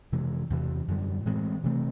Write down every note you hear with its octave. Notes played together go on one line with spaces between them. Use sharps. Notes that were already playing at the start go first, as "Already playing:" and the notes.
F2 C3 E3 G#3
E2 C3 E3
F#2 D3 G3
A2 E3 G#3 C4
C3 E3 A3 C4